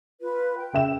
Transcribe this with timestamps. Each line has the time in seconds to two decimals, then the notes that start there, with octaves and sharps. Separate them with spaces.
0.21 F4 B4
0.57 G5
0.73 C#3 E5 E7